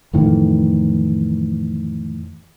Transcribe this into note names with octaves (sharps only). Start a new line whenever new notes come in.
F2 A2 D#3 E3